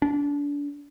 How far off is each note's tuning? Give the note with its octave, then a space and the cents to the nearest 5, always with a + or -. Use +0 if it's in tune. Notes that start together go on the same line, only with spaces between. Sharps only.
D4 -30